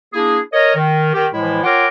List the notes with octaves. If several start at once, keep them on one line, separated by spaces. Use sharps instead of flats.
A#3 D4 E4 G#4
A#4 C#5 D#5
D#3
D#3 G4
A2 E3 F3 G#3 E4
F4 A#4 C#5 F#5 G5 D6